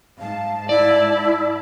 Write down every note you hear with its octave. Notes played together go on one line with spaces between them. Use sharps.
G#2 F5 A5
E4 D5